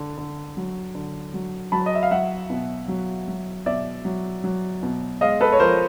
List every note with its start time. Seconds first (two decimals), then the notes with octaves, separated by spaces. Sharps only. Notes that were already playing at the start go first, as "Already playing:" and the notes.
Already playing: D3
0.18 D3
0.57 F#3
0.95 D3
1.34 F#3
1.72 F#3 A5 B5
1.86 D#5
1.95 E5
2.03 F5
2.11 F#3 E5 F#5
2.50 B2
2.88 F#3
3.28 F#3
3.66 B2 D5 E5
4.05 F#3
4.44 F#3
4.83 B2
5.21 G#3 D#5 F5
5.41 A4 B4
5.52 C#5
5.60 F3 A#4 C5